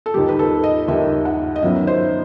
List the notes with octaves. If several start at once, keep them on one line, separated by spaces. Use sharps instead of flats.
A4
D#2 D#3 G3 G4
B4
A4
D#5
D#2 D#3 G3 E5
F#5
D#5
F#2 D#3 F#3 B3 E5
C5